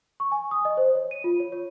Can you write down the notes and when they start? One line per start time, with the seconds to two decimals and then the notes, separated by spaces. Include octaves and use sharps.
0.20 C#6
0.32 G#5
0.51 D#6
0.65 D#5
0.77 C5
0.95 C#5
1.11 D#7
1.24 F4
1.40 C#5
1.52 C#5